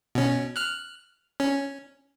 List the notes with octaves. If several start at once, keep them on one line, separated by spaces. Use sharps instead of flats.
B2 C#4
F6 F#6
C#4